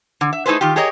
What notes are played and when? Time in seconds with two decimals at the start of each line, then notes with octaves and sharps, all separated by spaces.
0.21 D3
0.33 E5
0.46 A3 D#4 E4 G#4 B4 C5
0.61 D#3 F4 G4
0.76 G4 G#4 A#4 C#5 D#5